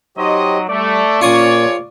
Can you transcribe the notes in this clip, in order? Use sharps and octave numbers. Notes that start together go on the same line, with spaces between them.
F#3 D#4 G4 C5 C#5 D#5
G3 A3 D5
A#1 A#2 A#3 C#4 F4 C#5 C#6 D#6